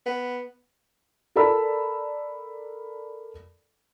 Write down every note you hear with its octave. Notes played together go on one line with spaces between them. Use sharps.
B3
A4 A#4 D5 A5 B5 E6